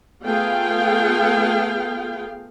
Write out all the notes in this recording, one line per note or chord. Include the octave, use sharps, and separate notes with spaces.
A3 B3 F4 G#4 F5 G5